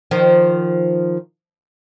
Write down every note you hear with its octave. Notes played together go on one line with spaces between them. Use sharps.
D#3 F3